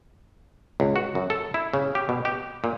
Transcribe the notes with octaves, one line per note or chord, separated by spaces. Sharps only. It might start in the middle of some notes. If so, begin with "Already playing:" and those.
C#2
F#4
F#2
A4
E4
C#3
G4
B2
G4
A#2